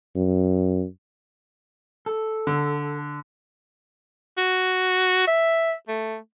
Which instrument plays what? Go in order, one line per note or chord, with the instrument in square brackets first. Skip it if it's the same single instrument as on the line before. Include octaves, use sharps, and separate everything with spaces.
[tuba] F#2
[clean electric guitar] A4
[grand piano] D3
[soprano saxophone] F#4
E5
A3